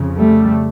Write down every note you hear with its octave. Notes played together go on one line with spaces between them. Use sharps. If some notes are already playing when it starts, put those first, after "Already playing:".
Already playing: F2 C#3
G3 A3